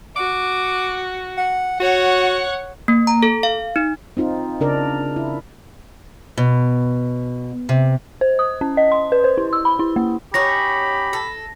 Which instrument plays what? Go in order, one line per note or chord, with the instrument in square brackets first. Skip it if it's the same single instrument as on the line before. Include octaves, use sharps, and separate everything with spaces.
[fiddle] F#4 [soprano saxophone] D6
[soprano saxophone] F#5
[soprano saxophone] F#4 [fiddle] C#5 F#5
[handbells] A#3
A#5
A4
F5
D#4
[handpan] C4 D#4 F4
C#3 D4 A#4 D5
E4
[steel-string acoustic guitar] B2
C3
[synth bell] C5
D#6
C#4
D#5
C6
B4
C5
E4
E6
B5
E4
A#3
[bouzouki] C#4 D#4 F#4 [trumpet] G4 [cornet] B5 [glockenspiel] A#6
[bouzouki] A4